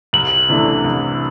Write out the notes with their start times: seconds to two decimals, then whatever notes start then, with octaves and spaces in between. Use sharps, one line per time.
0.13 C2 F#7
0.49 C3 E3 A3 D4
0.84 C2